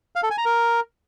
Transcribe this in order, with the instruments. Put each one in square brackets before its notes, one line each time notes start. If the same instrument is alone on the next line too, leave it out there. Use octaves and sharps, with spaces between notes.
[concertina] F5
A4
G#5
A#5
A#4